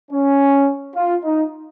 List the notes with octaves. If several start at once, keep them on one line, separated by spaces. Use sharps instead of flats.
C#4
F4
D#4